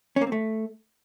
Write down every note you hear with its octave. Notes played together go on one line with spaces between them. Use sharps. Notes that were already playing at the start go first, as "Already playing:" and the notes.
C#4
A#3
C4
A3